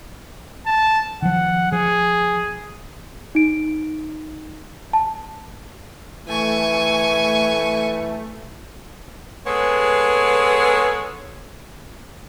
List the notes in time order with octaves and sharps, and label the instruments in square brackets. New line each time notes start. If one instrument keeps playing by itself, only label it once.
[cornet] A5
[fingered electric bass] D#3 F3 [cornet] F#5
[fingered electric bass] F3 [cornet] G#4
[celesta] D#4 D7
A5
[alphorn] E3 [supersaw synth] A3 [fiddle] G#5 C#6
[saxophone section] G#3 B3 G#4 A4 C#5